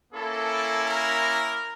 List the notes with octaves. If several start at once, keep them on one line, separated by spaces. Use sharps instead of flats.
A#3 C#4 E4 A4
A#4